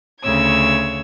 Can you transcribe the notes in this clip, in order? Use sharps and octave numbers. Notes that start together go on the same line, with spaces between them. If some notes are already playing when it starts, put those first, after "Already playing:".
D2 C#3 C#5 E6 G#6